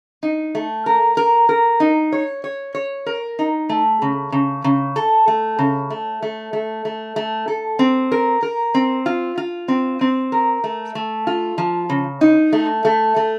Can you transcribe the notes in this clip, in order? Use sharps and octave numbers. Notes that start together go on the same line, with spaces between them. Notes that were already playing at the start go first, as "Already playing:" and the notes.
D#4
A3
A#4
A#4
A#4
D#4
C#5
C#5
C#5
A#4
D#4
A3
C#3
C#3
C#3
A4
A3
C#3
A3
A3
A3
A3
A3
A4
C4
A#4
A#4
C4
F4
F4
C4
C4
A#4
A3
A3
F4
F3
C#3
D#4
A3
A3
A3